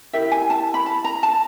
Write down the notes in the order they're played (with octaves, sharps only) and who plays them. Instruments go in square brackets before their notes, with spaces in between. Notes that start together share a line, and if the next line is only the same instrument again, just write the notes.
[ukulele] E4 G4 A#4 E5
G#5
A5
B5
A5
A#5
A5